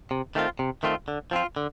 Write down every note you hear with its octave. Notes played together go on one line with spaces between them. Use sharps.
C3
D#3 A3 C4 F4
C3
D#3 A3 C4 F4
D3
F3 C4 F4
D3